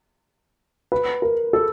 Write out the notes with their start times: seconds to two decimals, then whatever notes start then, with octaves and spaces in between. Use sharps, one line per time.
0.92 B4
1.22 A#4
1.53 A4